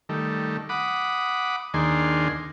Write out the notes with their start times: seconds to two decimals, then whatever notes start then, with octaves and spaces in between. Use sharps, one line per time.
0.09 D#3 G3 A3
0.69 F#5 B5 D6 D#6
1.74 D#2 D#3 A#3 D4 G#4 C6